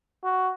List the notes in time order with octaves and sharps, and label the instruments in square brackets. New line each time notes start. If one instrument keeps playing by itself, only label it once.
[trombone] F#4